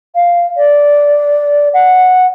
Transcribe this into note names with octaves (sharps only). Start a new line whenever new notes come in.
F5
D5
F#5